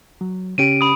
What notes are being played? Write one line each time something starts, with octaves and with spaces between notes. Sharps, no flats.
F#3
C#3 C#4 G4 D7 D#7
B5 D#6